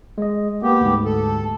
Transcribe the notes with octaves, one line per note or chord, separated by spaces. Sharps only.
G#3 D#5
A#3 B3 G4
D2 G#2
A4